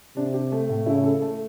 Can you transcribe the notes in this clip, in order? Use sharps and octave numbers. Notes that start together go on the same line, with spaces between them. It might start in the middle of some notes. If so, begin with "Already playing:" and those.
C3 D4
G4
A3
A2
C#3 E4
A4
A3